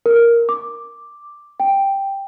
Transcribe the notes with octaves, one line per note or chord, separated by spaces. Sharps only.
A#4
D6
G5